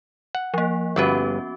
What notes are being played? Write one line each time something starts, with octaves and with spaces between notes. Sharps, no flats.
F#5
F3 A#3
G1 B3 C#4 F#4 B4